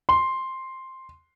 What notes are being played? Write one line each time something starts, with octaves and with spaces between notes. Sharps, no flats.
C6